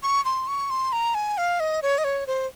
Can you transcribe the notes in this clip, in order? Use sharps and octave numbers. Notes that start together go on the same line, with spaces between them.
C#6
C6
C#6
C6
A#5
G#5
F5
D#5
C#5
D#5
C#5
C5